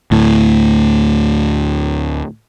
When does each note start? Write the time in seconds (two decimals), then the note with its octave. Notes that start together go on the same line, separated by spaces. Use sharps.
0.11 D2 A2